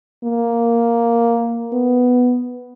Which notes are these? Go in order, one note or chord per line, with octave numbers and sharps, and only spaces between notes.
A#3
B3